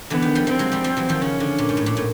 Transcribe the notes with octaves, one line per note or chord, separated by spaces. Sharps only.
D3 E3 B3
D#3
F3 G3
F3 G3 C4
F#3 G#3
F3 G3
F3 G3
E3 F#3
D#3 F3
C#3 C#4
D3
A#2
G#2
A2
A#2
A2